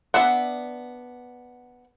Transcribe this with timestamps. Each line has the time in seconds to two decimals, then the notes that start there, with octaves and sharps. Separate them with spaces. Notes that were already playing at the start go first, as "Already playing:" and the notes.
0.14 B3 D4 E5 F#5